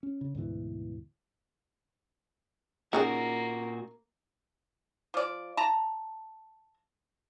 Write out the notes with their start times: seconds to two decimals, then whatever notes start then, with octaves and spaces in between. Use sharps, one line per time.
0.03 C#4
0.21 C#3
0.35 D2 G#2 B2 E3
2.93 A#2 A#3 C#4 D#4 F#4 G#4
5.14 F3 D5
5.57 A5 A#5